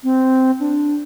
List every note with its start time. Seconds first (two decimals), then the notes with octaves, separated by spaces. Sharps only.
0.04 C4
0.60 D4